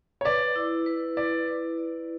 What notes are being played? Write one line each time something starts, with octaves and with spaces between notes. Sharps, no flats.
C#5
B4 D5
E4
B4
B4 D5
B4
D5